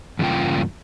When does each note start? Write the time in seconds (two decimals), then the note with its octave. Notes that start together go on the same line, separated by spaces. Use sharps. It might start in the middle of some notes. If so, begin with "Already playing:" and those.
0.19 E2 G2 C#3 A#3 F4 G5